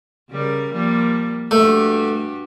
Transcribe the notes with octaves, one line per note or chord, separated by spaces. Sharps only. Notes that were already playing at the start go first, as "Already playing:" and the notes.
C#3 G3 A#4
F3 G3 A#3
G2 A3 F#4 G4